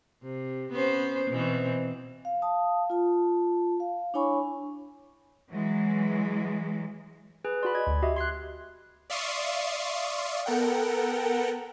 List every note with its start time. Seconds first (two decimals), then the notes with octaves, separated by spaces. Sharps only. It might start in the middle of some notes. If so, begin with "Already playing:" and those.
0.22 C3
0.72 B3 C#4 C5
1.30 B2 E3 C4
2.25 F5
2.42 F5 A5 D#6
2.90 F4 A5
3.80 F5
4.14 D4 E4 C#5 G#5 B5 C#6
5.52 E3 F#3 G#3
7.45 G#4 B4 G#5
7.63 F#4 D5 B5 C6
7.75 D#5 G#6
7.87 D2
8.02 F#4 G4 D#5 E5
8.16 C6 F#6 G#6 C7
9.10 D5 E5 F5 C6 C#6 D#6
10.46 B3 A4 A#4 F#5 G5